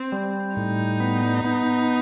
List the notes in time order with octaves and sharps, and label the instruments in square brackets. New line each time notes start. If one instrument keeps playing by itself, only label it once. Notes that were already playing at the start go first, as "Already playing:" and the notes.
Already playing: [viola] C4
[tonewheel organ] G3
[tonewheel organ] A2 [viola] D#4
[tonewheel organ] B3
B3